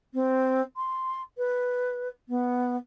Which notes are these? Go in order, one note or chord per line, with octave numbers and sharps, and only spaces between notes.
C4
C6
B4
B3